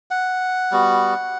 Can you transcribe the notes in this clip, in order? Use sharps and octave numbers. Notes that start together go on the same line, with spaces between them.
F#5
G3 B3 F#4